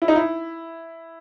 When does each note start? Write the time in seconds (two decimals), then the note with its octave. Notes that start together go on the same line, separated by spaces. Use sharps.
0.02 E4
0.08 D#4
0.16 E4